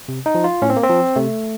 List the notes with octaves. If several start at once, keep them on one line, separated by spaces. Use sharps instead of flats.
C3
D#4
F3
F4
A2 C#4
C4
A#3
C4
F3
C3 A3